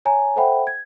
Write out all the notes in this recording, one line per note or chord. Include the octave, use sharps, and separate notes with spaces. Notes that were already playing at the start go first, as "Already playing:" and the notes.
C#5 G#5 A#5
A4 C5 E5 F#5 G5 B5
G#6